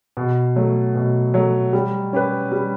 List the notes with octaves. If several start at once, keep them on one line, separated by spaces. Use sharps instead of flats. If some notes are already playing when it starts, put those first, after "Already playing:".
B2
F#3 A3
B2
F#3 A3
G3
C#4 G4 B4
G3